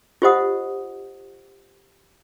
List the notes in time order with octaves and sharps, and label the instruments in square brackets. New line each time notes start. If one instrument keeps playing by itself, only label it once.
[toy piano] F4 G4 C5 D#5 F#5 D#6